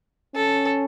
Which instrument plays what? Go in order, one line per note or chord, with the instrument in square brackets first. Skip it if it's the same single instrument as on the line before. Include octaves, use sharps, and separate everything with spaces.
[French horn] C#4 [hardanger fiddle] A4